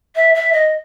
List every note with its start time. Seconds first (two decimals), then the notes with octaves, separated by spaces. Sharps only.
0.16 E5
0.35 E5
0.53 D#5